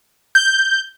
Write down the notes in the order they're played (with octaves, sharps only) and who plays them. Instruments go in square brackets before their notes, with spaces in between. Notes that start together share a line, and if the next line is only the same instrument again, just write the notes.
[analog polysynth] G6